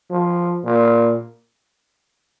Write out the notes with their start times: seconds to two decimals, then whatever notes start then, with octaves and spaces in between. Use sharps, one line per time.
0.10 F3
0.64 A#2